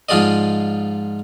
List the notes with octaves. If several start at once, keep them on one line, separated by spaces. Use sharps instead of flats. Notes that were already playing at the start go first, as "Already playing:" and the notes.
G#2 F3 F4 G#4 D5 D#5